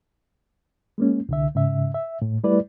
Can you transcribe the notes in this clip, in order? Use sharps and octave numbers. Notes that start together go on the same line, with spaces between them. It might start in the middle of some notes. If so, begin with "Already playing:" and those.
G#3 A#3 C#4
C2 D3 E5
G#2 C#3 E5
E5
A2
G3 A3 E4 B4 D5